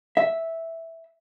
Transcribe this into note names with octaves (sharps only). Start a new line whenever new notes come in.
E5